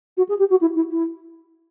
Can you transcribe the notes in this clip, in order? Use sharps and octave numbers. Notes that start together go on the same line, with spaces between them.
F#4
G#4
G4
F#4
E4
E4
E4